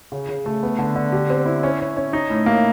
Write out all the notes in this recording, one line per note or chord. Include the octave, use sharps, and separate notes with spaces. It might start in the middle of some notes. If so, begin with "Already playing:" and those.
C#3
C#3
A3
B3
D3
D3
G4
C4
E4
C#4
C#4
C#4
D#4
A2
A#3